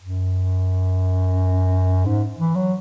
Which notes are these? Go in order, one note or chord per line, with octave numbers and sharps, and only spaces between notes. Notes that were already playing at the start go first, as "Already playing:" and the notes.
F#2
G#2
E3
F#3